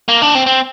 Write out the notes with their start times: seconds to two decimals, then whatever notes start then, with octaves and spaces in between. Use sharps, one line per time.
0.08 A#3
0.22 D4
0.35 C4
0.46 C4